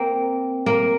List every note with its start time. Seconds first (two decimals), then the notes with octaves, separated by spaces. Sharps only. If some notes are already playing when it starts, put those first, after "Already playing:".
Already playing: A#3 C4
0.66 A#3